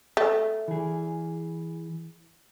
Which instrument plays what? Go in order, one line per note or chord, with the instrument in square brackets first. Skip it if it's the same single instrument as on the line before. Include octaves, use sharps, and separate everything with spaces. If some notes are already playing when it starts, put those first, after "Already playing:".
[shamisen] A3
[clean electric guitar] E3 G#4